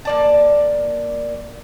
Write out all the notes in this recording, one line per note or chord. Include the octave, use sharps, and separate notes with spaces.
A#3 D5 A5